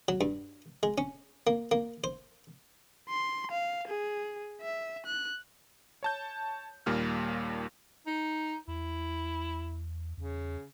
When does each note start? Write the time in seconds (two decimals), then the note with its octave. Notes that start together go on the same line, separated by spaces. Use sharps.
0.08 F#3
0.21 G2
0.83 G#3
0.98 C#4
1.47 A#3
1.71 A#3
2.04 C5
3.09 C6
3.51 F5
3.88 G#4
4.61 E5
5.06 F#6
6.03 C#5 A5 G6
6.86 D#2 A#2 G3 A#3 F6
8.07 D#4
8.68 E2 E4
10.17 E2 C#3